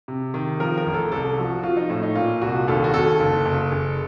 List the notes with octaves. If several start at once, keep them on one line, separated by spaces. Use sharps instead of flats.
C3
D#3
F3 A#4
A#4
A1
A4
C2 A4
F3 F#4
F#4
F3 F4
D#4
A2
D#4
A#2 F4
C2 F#4
D#2 A4
F#4
D#2 A4
F#1
F#1
F#1